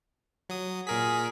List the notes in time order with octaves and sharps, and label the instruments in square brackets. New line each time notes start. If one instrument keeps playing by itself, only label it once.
[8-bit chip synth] F#3 D#6
[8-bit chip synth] A#2 A#4 B6 [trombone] G#4